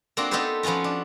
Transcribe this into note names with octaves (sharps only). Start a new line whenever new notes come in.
A#3 C4 D4 F4 F#4
B3 D#4 G4 A4 B4 C5
F3 B3 C#4 F4 F#4
D4